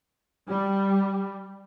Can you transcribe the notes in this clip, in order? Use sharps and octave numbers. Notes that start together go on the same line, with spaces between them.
G3